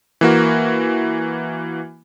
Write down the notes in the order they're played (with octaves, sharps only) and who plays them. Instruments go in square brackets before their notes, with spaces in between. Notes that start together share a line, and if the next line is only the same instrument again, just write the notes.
[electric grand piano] E3 A#3 F#4